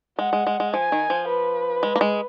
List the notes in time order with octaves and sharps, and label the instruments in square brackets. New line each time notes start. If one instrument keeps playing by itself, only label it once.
[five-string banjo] G#3 [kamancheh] F#5
[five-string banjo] G#3
G#3
G#3
[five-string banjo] F3 [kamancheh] G#5
[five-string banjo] D#3
F3
[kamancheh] B4
[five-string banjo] G#3
A#3
G#3